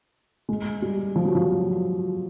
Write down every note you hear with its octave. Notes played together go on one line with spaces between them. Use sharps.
G#3
G3
F3
F#3
F3